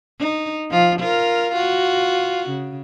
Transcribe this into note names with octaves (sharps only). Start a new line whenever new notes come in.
D#4
F3 F4
F4 A#4
F4 F#4
C#3